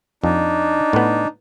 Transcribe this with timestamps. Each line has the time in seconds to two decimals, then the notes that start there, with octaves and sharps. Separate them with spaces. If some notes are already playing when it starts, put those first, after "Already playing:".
0.24 F2 D4 D#4
0.93 A2 B3